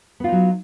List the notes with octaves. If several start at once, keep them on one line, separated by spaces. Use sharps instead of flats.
F#3 B3 D#4 F4